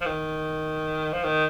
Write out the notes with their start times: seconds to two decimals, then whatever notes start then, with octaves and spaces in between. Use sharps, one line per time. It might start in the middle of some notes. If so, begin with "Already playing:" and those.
0.01 F3
0.06 D#3
1.13 F3
1.25 D#3